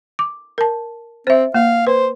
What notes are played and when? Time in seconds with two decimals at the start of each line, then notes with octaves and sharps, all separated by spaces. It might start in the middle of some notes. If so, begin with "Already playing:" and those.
0.19 D6
0.58 A#4 A5
1.27 C4 C5 E5
1.54 A#3 F5
1.87 B4 C5